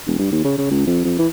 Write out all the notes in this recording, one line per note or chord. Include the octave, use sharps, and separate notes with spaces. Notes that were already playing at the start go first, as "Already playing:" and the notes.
E1
G2
D#2
C#3
C#3
C#2
F2
F2
E3